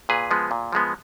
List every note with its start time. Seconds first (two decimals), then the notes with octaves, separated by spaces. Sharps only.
0.09 A#2 G#4 B4
0.31 F3 G#3 B3
0.51 A#2
0.73 F3 G#3 B3